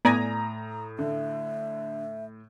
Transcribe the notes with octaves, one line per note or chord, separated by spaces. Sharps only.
A2 B3 D5 G#5 A#5 D#6 A#6
D3 E5